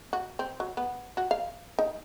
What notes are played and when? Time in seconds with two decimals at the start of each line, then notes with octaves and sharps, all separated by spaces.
0.13 F#4
0.39 C4
0.60 F#3
0.77 B3
1.17 F#4
1.31 F5
1.79 D#4